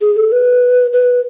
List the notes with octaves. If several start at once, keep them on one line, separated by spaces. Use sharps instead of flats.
G#4
A4
B4
B4